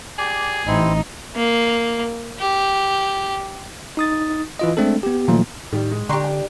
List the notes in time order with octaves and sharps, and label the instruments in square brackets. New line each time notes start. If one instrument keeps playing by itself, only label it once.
[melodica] G4 D5 [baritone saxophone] G#4
[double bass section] A1 [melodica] C4 E4 [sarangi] D#4
[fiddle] A#3
G4
[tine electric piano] D#4 D#6 A6
E3 F4 D#5
G#3 A3 C4 D4 A4
B3 G4
A#2 D#3 F3 F#3 A3 A#3
[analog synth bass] A2 [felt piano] D#3 G3
[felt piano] G#3
[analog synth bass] D3 [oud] D4 G4 [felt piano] A#5 C6 C#6
[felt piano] G5